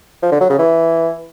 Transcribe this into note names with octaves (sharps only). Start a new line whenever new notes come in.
F3
D3
F#3
C#3
E3